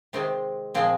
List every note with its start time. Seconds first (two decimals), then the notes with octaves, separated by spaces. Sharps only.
0.13 C3 D#3 G#3 C4
0.74 A#2 F3 G#3 C4